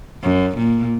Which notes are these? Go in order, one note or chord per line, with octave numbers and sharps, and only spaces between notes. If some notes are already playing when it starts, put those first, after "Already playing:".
F#2
A#2